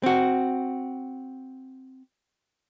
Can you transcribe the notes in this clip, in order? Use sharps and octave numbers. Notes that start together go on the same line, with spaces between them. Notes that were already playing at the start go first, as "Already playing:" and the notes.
C4 F#4